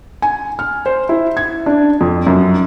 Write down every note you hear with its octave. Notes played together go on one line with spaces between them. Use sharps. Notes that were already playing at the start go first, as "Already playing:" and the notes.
G#5
F6
C5
E4
G#6
D4
F2
F#2